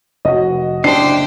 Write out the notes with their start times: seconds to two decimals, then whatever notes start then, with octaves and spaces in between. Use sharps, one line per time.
0.25 F1 F#4 D#5
0.84 F#1 A2 C#4 D4 G4 C5 C7